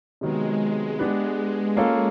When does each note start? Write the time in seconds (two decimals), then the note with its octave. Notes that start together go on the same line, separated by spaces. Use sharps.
0.21 C3 D#3 F#3 G#3 B3
0.99 B3 D4 G4 B4
1.77 A#3 C#4 F4 A4